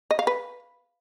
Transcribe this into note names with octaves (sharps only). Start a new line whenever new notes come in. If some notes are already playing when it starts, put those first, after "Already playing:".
D#5
F5
B4